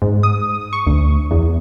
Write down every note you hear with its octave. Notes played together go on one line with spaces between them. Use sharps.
G#2
D#6
C#6
D2
E2